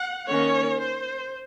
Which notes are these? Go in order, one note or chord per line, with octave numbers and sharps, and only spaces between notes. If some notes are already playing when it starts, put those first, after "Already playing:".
Already playing: F#5
D#3 A#3 C#4 C#5
C5